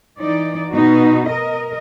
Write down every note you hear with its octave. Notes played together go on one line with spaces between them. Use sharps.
E3 D#4 D5
B2 B3 D#4 F#4
A#4 D#5